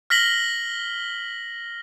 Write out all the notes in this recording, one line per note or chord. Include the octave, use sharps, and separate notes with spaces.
F6 A#6 B6 F#7 G7